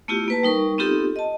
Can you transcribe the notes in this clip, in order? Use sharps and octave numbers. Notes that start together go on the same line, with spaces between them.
A3 B3 E4 F4 G4
A#3 B4 A5
G3 D#4 A#4 C#6
B3 C4 D#4 F4 G4 A4
D#5 A5